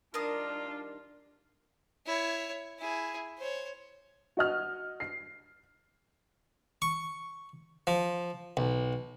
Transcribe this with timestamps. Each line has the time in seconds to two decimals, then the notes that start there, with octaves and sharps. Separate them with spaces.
0.14 D#3 G3 D4 F4 A#4 A5 D#6
2.06 E4 C#5
2.78 E4 G#4
3.38 C5 C#5
4.37 F#4 D#5 F6
5.00 C7
6.82 C#6
7.87 F3
8.57 B1